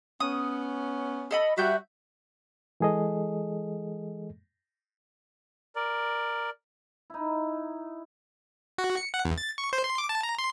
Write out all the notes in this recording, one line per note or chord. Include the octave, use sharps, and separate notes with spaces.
B3 C#4 D#6
A4 D#5 B5
G3 F#4 E5 G6
E3 G#3 G#4 A4 D#5
A#4 D5
D#4 E4
F#4
C#7
F#5
E2
A6
C#6
C5
C6
D6
A5
A#5
C6